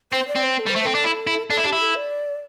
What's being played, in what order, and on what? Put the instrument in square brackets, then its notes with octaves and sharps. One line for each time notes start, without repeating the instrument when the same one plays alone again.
[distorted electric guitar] C4 [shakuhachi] C5
[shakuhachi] D5
[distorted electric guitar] C4
[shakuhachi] C5
A4
[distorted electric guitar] G3 [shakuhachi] C5
[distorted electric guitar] A3
[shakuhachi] C5
[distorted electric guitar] C4 [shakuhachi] A4
[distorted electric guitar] D4
E4
E4
[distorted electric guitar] D4 [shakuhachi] A4
[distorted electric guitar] E4
[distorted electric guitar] D4 [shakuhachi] G4
[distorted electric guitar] E4
[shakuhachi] A4
D5